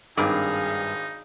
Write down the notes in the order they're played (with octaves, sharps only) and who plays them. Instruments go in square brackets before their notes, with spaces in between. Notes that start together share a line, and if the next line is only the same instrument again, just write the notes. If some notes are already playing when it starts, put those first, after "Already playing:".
[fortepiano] G#1 D#3 D6 [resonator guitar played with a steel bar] G2 [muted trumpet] D#4 [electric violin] G#4 F5